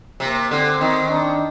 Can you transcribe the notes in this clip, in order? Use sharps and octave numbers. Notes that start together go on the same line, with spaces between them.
C3 A#3
D3 C4
D#3 C4
D4